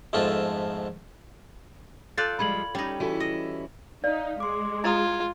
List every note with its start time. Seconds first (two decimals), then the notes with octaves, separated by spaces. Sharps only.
0.13 F2 G#2 A3 B3 F4 A4
2.17 F4 A4 D5 F#6 G6 A6
2.39 F3 G3 G#3 B5 G#6 F#7
2.75 G3 C#4 D#4
3.00 E3 C#4 E4 F#4 A4
3.20 D#5
4.04 D#4 D5 F5
4.40 G#3 C6 D6
4.84 E4 F4 A#5 D#6 G#6